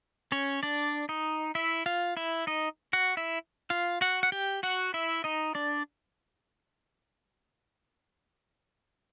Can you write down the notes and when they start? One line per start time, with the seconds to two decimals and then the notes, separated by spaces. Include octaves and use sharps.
0.32 C#4 C#5
0.63 D4 D5
1.09 D#4 D#5
1.55 E4 E5
1.86 F4 F5
2.17 E4 E5
2.47 D#4 D#5
2.93 F#4 F#5
3.17 E4 E5
3.70 F4 F5
4.01 F#4 F#5
4.23 F#5
4.32 G4 G5
4.63 F#4 F#5
4.94 E4 E5
5.24 D#4 D#5
5.55 D4 D5